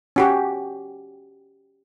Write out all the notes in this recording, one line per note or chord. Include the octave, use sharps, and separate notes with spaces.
C#4 F#4 G4